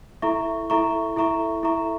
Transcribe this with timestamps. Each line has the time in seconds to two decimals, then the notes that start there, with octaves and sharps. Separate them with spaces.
0.22 E4 A4 E5 A#5 C#6
0.70 E4 A4 E5 A#5 C#6
1.16 E4 A4 E5 A#5 C#6
1.63 E4 A4 E5 A#5 C#6